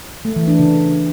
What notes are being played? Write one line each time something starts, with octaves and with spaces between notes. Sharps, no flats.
A3
E3
D4
C#3